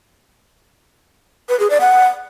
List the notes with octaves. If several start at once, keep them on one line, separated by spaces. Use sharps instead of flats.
B4
G#4
D5
F#5